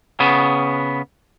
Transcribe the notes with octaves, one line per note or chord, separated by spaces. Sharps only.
C#3 B3